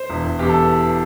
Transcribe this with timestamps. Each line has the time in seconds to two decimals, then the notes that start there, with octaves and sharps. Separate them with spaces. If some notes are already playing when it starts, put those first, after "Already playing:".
Already playing: C5
0.10 E1
0.24 E1
0.39 E2 G4
0.49 A4